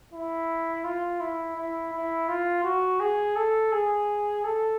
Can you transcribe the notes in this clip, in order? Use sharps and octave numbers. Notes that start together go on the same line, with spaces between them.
E4
F4
E4
E4
E4
F4
F#4
G#4
A4
G#4
A4